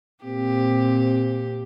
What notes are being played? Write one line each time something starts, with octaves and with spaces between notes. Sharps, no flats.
A#2 C4 G4